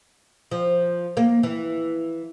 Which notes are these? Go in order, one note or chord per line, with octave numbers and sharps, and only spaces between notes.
F3
A#3
E3